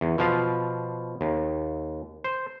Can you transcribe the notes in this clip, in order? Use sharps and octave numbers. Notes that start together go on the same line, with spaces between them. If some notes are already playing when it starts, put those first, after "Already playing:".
E2
B2 F3 F5
D#2
C5